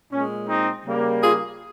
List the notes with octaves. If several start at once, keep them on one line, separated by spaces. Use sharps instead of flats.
A#2 G#3 C#4
C4 D#4
C#3 G3 A#3
F4 G#4